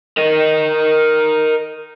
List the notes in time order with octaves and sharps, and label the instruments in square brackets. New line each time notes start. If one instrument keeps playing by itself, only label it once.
[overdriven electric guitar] A#4 D#5